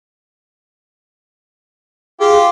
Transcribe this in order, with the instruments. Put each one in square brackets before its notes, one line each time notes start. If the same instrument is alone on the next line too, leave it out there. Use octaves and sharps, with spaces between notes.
[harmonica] F4 G4 [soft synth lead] G#4